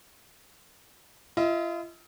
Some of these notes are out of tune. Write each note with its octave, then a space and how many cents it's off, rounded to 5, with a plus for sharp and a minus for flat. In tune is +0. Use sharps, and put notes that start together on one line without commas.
F4 -40 D#5 +35